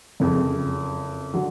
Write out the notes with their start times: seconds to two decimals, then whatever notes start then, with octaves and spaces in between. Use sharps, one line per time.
0.20 F#1 F2 C#3
1.34 D3 F#3